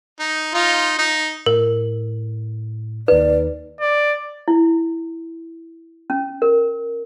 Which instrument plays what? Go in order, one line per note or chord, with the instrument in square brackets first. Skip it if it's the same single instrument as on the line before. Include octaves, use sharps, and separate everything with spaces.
[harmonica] D#4
D#4 F4
D#4
[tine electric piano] A2 [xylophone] A#4
[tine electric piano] D#2 D#4 [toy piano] B4 [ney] D5
[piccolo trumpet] D5
[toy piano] E4
C#4
A#4